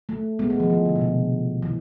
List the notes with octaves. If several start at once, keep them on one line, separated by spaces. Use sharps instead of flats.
A3
G#3 B3
G#3
F3
E3
D3
B2
C3
E3